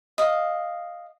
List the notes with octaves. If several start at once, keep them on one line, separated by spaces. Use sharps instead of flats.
D#5 F5